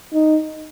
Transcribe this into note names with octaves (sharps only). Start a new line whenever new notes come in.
D#4